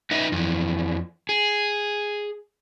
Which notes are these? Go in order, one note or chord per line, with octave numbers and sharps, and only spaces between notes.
D#4 B4 D#5 E5
F2 E3
G#4